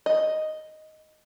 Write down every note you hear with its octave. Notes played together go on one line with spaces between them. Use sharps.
D#5